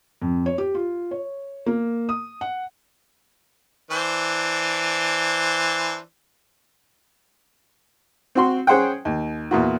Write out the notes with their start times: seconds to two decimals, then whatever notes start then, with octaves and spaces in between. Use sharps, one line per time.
0.22 F2
0.46 C#5
0.58 G4
0.75 F4
1.11 C#5
1.66 A#3
2.09 D#6
2.41 F#5
3.91 E3 D4 C5
8.35 C4 F#4 C6
8.67 C#4 G#4 C5 F#5 G5
9.05 D#2
9.51 E2 A#2 F#4